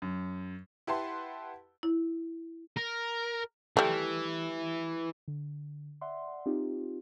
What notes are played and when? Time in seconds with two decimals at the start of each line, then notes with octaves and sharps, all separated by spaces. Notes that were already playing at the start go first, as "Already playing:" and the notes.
0.02 F#2
0.87 E4 G4 B4 F#5 A5 C6
1.83 E4
2.77 A#4
3.77 E3 G3 A3
5.28 D3
6.01 D5 E5 F#5 C6
6.46 C4 D#4 F4 G4